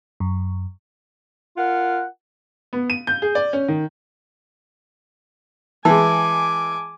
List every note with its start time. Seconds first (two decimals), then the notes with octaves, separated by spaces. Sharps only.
0.20 F#2
1.57 F4 A#4 F#5
2.73 B3
2.90 D#7
3.07 G6
3.22 G#4
3.35 D5
3.53 C#4
3.68 D#3
5.85 E3 G#3 G#5 A5 D6